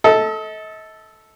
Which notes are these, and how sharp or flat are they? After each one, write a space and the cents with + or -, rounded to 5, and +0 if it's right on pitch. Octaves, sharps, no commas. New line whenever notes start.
A4 -5 D#5 +40